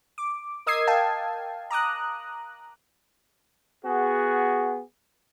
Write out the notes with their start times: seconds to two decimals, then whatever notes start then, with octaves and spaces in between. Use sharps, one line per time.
0.18 D6
0.66 A#4 D#5 D#6 E6 G#6 C7
0.87 F5 G5 A5
1.70 A#5 D6 D#6 F#6
3.85 B3 F#4 G#4